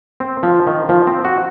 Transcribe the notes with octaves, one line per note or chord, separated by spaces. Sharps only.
C4
F3
D#3
F3
C4
F#4